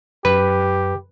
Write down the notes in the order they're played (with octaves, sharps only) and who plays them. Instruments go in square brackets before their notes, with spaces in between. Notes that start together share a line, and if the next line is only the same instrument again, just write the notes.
[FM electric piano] F#2 [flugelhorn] G4 [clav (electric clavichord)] B4